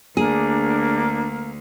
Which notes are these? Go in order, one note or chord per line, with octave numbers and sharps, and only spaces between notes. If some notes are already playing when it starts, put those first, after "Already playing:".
D2 A#3 D4 G#4